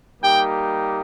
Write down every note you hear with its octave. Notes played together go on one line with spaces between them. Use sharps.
G3 A#3 D#4 G4 G5